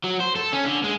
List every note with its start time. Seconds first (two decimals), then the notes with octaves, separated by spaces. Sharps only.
0.04 F#3
0.20 C5
0.36 A4
0.53 C#4
0.65 D3
0.84 G#3